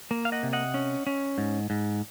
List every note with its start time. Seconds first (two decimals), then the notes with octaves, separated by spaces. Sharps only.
0.11 A#3
0.25 F5
0.32 D#5 F#5
0.43 C3
0.53 D#5 F#5
0.74 C#4
1.07 C#4
1.38 G#2
1.70 G#2